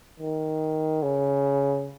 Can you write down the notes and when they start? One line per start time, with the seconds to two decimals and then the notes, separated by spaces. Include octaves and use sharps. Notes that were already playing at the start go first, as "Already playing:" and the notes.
0.20 D#3
1.03 C#3